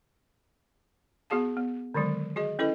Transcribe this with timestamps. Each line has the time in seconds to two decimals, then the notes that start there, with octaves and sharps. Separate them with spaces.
1.30 B3 F#4 G#4 F5 A5
1.57 B3
1.94 D3 D#3 F#3 G#3
2.36 F#4 G#4 D#5
2.59 C#4 E4 A4 B4 D#5